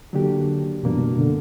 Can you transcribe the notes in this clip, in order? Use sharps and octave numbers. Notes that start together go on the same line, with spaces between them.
D3 F#3 A#3 D4 G4
F#2 B2 E3 G3 A#3 D4
B2
B2
D3